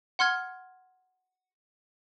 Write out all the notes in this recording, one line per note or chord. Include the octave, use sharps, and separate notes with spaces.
F#5 C6 F6 G#6